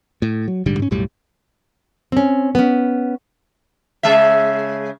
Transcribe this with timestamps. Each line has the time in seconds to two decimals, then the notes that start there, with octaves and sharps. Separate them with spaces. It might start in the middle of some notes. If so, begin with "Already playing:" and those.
0.22 A2
0.48 F#3
0.66 A#1 G#2 D3 G3
0.79 G#2 C#4
0.91 B1 F#2 A2 G3
2.12 C4 C#4
2.55 B3 C#4
4.03 C#3 G#3 E5